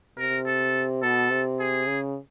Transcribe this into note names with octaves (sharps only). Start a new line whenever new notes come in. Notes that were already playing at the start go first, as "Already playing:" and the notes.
C3 A#4
A4
B2 A4
C3
G#4
C#3